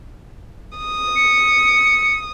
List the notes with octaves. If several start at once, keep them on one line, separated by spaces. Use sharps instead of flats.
D#6
C#7